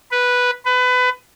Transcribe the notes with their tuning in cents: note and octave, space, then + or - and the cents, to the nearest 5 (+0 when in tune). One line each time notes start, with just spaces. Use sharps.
B4 -5
B4 +25